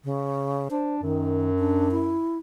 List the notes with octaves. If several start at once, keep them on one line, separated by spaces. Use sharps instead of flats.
C#3
D4 C5
F#2 D#3
D4
E4